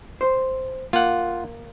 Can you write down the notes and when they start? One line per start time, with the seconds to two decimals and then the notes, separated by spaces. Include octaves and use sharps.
0.21 C5
0.93 A#3 F4 F#5